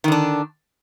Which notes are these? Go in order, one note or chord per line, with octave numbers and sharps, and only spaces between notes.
D3 D#3 D4